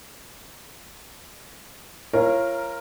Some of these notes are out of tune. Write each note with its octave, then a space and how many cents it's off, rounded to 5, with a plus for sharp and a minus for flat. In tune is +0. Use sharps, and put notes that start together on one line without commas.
F4 -35 A#4 +0 C#5 -20